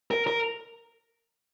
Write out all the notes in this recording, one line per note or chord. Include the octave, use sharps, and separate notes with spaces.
A#4
A#4